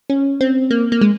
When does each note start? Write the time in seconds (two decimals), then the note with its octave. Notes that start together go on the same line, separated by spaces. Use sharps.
0.10 C#4
0.41 C4
0.71 A#3
0.92 A#3
1.01 G#3